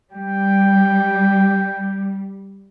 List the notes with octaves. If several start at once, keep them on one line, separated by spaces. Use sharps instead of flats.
G3 G5